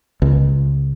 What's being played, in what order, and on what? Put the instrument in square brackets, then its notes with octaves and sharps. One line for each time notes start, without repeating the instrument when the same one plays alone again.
[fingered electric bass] C#2